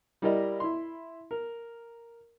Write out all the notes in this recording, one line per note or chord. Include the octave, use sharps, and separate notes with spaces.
G3 E4 A#4 D5 D#5
E4 C6
A#4